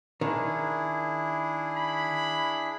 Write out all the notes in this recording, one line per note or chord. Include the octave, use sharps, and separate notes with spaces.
D#3 D4 E4 G#4
B5